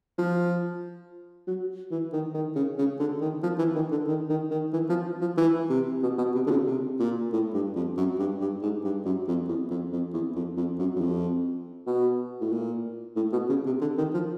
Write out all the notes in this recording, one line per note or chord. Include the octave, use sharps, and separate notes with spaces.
F3
F#3
E3
D#3
D#3
C#3
C#3
D3
D#3
F3
E3
D#3
D3
D#3
D#3
D#3
E3
F3
F3
E3
C3
B2
B2
C3
D3
C#3
C3
A#2
A2
G2
F2
F#2
G2
G2
G#2
G2
F#2
F2
E2
F2
F2
E2
F2
F2
F#2
F#2
F2
B2
A2
A#2
A2
B2
C#3
C3
D3
D#3
F3